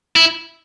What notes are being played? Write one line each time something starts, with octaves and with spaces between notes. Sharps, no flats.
E4